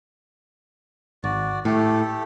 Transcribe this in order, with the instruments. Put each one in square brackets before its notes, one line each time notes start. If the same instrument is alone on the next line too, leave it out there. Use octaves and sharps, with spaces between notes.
[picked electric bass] G#1 [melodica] F#4 D5
[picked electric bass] A2 [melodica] A3 G4 A4